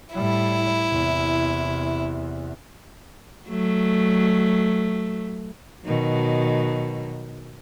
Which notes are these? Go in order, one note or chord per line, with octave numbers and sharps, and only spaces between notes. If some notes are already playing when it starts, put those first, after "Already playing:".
A2 G3 E4
E2 C3
F#3 A3
B2 D#3 F#3